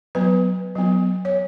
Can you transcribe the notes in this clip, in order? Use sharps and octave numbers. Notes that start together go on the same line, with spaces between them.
F#3 B3 B4
F#3 B3
C#5